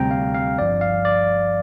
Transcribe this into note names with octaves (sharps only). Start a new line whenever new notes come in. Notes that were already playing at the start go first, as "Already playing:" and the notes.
Already playing: D2 C3 G3 C4 G5 A#5
F5
F5
G1 G2 F3 D5
F5
D5